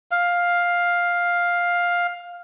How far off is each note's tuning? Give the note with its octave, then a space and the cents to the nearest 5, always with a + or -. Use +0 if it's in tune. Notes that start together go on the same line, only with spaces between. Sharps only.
F5 +5